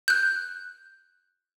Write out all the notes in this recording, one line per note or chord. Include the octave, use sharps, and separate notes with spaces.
F#6 G6